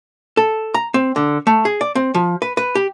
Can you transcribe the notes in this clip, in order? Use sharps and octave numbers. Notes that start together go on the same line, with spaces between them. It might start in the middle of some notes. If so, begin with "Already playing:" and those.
A4
A#5
C4
D3
A3
G#4
D5
C4
F3
B4
B4
G4